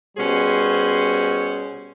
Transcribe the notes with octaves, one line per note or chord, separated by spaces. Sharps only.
B2 G3 C#4 G#4 C5